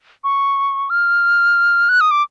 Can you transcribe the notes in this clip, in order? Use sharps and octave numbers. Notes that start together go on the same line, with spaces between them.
C#6
F6
F#6
D#6
D6